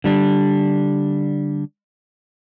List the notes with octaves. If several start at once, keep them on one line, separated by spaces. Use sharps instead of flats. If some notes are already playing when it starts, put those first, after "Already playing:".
D3 G3 D4